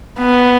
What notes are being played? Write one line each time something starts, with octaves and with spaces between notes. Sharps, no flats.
B3